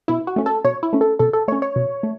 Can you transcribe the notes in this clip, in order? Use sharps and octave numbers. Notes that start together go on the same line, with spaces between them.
B2 E4
F#4
A3 C#4
A4
B2 C#5
E4
A3 C#4
A4
B2 A4
A4
A3 C#4 C#5
C#5
B2
A3